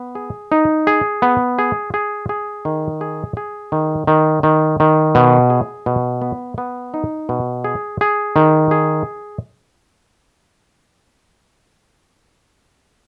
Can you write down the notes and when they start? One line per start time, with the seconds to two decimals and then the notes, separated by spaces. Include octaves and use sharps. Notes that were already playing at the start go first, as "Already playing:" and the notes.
Already playing: B3
0.15 G#4
0.52 D#4
0.87 G#4
1.22 B3
1.59 G#4
1.94 G#4
2.29 G#4
2.65 D#3
3.01 G#4
3.37 G#4
3.72 D#3
4.07 D#3
4.43 D#3
4.80 D#3
5.15 B2
5.50 G#4
5.86 B2
6.22 B3
6.58 B3
6.94 D#4
7.29 B2
7.64 G#4
8.01 G#4
8.36 D#3
8.71 G#4